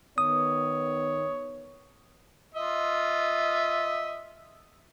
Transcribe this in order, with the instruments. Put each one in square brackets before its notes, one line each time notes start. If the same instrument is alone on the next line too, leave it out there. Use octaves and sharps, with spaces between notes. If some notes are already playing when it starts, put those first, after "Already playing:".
[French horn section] D#3 B3 [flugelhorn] C#5 [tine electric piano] D#6
[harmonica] F4 D#5 E5